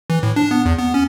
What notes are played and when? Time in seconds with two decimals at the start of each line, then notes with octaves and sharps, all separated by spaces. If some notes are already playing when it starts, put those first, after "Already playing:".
0.10 E3
0.23 A2
0.36 D4
0.51 B3
0.65 E2
0.78 B3
0.94 C#4